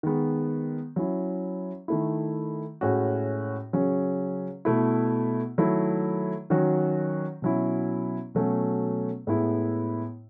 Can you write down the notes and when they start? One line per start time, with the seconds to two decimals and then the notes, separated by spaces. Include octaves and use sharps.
0.03 D#3 G#3 B3
0.96 F#3 C#4 E4
1.88 D#3 A3 E4
2.81 A2 G#3 C#4 F#4
3.73 C#3 F#3 C#4
4.65 B2 A3 E4
5.58 D#3 F#3 A3 E4
6.50 D#3 F#3 C#4 F#4
7.42 B2 F#3 C#4 E4
8.35 B2 F#3 A3 C#4
9.27 A2 G#3 B3 E4